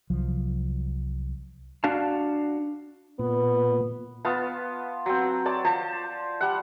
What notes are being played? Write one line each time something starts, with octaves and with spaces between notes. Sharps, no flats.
C2 F3 F#3
D4 F#4 F5 A5
A#2 B3
B3 F4 A5
F#3 C4
C#5 D5 A5
F3 C5 A5
G3 F#5